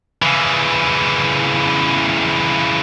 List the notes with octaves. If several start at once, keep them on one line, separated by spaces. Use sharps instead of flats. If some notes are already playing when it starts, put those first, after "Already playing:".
C#3 E3